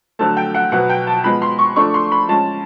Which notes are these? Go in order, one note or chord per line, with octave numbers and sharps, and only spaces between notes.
D3 F#3 A3 A5
G5
F#5
B2 F#3 B3 F#5
G5
A5
F3 G#3 B3 B5
C6
C#6
F3 A3 D4 C#6
C6
B5
F3 G#3 C#4 A5